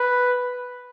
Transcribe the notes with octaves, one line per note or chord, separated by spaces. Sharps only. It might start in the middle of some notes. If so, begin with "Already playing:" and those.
Already playing: B4